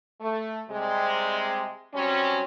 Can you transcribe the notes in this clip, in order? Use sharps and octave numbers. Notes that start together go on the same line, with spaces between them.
A3
C3 G3 G#3
F#3 G3 C4 C#4